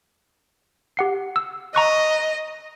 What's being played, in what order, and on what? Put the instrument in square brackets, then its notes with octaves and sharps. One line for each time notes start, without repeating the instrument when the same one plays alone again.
[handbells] G4 F#5 C7
E6
[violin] D#5 [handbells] A#5 C#6 F#6